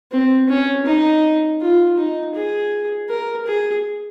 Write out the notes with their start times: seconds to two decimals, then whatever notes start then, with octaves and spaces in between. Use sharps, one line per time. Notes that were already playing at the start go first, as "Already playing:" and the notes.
0.12 C4
0.49 C#4
0.86 D#4
1.61 F4
1.97 D#4
2.35 G#4
3.09 A#4
3.47 G#4